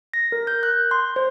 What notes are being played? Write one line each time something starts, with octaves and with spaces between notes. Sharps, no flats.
A#6
A#4
G6
F#6
C6
C5